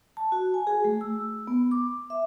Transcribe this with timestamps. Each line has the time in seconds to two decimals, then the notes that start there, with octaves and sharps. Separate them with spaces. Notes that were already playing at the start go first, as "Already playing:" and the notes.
0.17 A5
0.32 F#4
0.54 G#5
0.67 G#4
0.85 A3
1.01 E6
1.47 B3
1.71 D6
2.10 E5